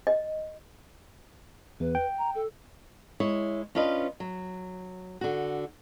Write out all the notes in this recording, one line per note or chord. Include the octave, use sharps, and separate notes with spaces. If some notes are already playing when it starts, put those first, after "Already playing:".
D#5
E2 B4
G5
A#5
A4
G#3 E4 C#5
C#4 D4 F4 B4 D#5
F#3
D3 F#4